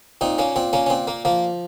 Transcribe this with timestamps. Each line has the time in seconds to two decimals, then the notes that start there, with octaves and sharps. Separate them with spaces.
0.21 A#2 C4 D#4
0.38 A#3 C#4
0.56 A#2 C4
0.73 A#3 C#4
0.86 C#4
0.90 A#2 C4
1.07 A#3
1.25 F3 A#3